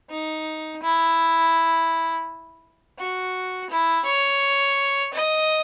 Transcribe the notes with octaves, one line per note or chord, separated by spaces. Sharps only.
D#4
E4
F#4
E4
C#5
D#5